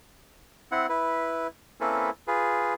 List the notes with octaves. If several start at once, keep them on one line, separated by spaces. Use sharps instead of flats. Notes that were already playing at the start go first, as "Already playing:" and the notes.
C4 E4 F#5
E4 B4
A#3 C4 C#4 E4 A4 B4
F4 G#4 B4